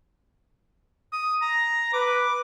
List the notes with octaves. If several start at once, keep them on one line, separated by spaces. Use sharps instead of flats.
D#6
A#5
B4 D6